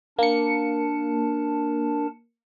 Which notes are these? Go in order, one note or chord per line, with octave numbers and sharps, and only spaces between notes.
A#3 D4 A#4 A5 C#7